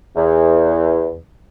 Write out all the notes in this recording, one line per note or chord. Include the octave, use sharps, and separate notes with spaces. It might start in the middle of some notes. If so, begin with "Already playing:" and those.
E2